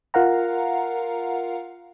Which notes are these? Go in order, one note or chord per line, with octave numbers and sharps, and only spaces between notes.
F4 A#4 F5 F#5 A#5